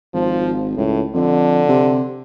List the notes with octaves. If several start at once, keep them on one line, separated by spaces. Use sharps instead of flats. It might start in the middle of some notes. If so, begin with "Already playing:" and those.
G#1 F3
C#2 A2
F2 D3
C3